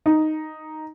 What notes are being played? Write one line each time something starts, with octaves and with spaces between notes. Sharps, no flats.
D#4